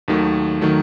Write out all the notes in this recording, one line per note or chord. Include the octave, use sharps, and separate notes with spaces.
D#2 D#3 F#3 A3
D#3 F#3 A3